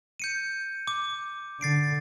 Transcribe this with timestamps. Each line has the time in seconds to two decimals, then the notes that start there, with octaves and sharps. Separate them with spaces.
0.20 G6 C#7 D#7
0.87 D6
1.61 D3 A6 C7 D7